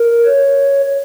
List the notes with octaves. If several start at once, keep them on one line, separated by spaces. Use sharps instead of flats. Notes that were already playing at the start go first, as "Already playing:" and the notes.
Already playing: A#4
C#5